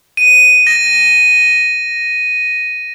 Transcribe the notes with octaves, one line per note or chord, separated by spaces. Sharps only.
D#7
A#6